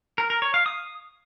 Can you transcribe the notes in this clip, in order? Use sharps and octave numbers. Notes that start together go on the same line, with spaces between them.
A#4
A#4
C#5
F5
D#6